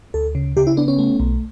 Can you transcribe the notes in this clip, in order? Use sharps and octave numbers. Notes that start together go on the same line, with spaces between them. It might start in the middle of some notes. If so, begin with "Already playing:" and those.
D2 A4
C#3
C#3 G4
E4
B3 D4
C#4
A3
B1